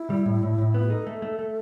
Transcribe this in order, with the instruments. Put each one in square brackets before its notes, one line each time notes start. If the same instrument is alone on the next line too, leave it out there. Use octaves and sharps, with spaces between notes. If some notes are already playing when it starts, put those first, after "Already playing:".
Already playing: [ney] E4
[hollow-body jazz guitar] G3
A2
A2
A2
B3
[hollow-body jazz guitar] D#4 [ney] A4
[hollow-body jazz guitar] A3
A3
A3